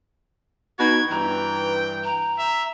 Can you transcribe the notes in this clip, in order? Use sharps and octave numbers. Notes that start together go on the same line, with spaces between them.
B2 D#4 F#4 G#6
G2 E3 G5 A#5
A#5
E5